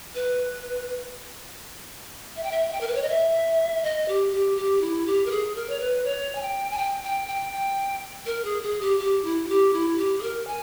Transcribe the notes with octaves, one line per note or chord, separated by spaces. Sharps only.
B4
E5
G5
E5
E5
G5
A#4
B4
C#5
D#5
E5
D#5
G4
G4
G4
E4
G4
A#4
G#4
A#4
C#5
B4
C#5
G#5
G5
G#5
G5
G5
G5
G5
A#4
G#4
G#4
G4
G4
E4
G4
E4
G4
G#4
A#4
G#5